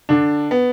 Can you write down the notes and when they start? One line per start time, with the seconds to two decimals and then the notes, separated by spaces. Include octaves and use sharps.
0.09 D3 D4
0.51 B3